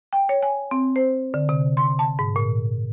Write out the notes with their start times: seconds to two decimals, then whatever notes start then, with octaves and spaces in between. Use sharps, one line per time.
0.13 G5
0.29 C#5
0.43 G#5
0.71 C4
0.96 C5
1.34 D3
1.49 C3
1.77 C6
1.99 A5
2.19 G#2
2.36 A#2